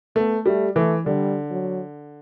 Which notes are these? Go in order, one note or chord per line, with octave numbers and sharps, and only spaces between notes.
A3 B3
G3 A3
E3 A3
D3 G3
F#3